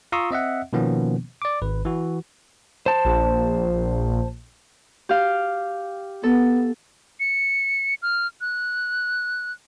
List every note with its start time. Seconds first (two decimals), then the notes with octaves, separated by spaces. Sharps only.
0.12 F4 A#5 C6 C#6 D#6 E6
0.31 C4 D#5 E5 F#5
0.73 B2 D#3 F3 A#3 B3 C#4
1.42 D5 D6
1.62 G#1 B4
1.85 E3 F#4
2.86 C5 A5
3.05 A#1
5.09 G4 F5
6.23 B3 A4
7.19 C#7
8.02 F6
8.41 F#6